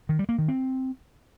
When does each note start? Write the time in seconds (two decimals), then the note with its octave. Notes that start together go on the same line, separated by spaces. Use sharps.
0.09 D#3
0.19 G3
0.29 A#3
0.38 D#3
0.48 C4